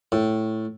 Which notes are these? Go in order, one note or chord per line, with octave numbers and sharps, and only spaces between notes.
A2